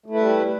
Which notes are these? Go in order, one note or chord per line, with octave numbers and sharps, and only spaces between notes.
G3 A3 E4 B4